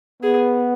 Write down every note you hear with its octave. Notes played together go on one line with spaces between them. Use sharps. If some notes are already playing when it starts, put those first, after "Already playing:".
B3 G#4